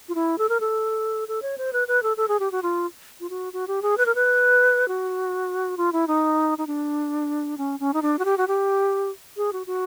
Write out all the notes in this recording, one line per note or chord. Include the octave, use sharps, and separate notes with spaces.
F4
E4
A4
A#4
A4
A4
C#5
C5
B4
B4
A4
A4
G#4
G4
F#4
F4
F4
F#4
F#4
G4
G#4
B4
A#4
B4
F#4
F4
E4
D#4
D#4
D4
C#4
C#4
D#4
D4
F#4
G4
F#4
G4
G#4
F#4
F#4